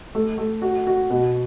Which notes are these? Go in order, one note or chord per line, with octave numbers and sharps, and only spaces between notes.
A3
A3
F#4
F#4
B2